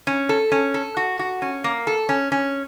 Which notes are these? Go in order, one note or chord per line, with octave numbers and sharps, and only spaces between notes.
C#4
A4
C#4
A4
F#4
F#4
C#4
A#3
A4
C#4
C#4